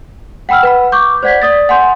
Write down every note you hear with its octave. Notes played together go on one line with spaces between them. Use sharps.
F#5 G5 B5 E6 F6
B4 F#5 B5
C#6 D6 G6
C5 D5 F#5 G#6 B6
D5 D#6 A6
F#5 G#5 C6 G6